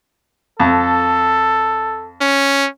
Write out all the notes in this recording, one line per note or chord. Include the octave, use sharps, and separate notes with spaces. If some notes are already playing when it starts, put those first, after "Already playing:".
F2 A4
C#4